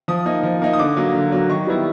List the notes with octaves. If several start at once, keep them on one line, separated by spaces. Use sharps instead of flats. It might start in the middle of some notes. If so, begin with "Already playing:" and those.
F3 D#6
A#3 D#4
F3
A#3 D#4
D#6
D3 D6
F#3 A#3
D3
F#3 A#3
D#3 C#6
G3 B3 E4